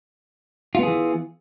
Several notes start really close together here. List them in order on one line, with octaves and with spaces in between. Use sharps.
F4 B3 G#4 E3